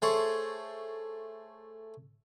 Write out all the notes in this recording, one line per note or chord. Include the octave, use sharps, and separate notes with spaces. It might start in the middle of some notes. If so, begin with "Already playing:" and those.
A3 G#4 C5 C#5